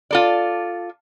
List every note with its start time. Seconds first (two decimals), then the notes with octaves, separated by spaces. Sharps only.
0.11 F4 A4 D5